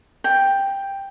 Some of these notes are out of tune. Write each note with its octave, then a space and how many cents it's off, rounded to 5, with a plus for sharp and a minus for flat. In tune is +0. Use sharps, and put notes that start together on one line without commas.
G5 +5